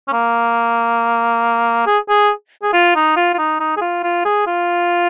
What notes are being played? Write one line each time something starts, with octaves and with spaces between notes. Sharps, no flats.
C#4
A#3
G#4
G#4
G#4
F4
D#4
F4
F4
D#4
D#4
G#4
F4
F4
G#4
F4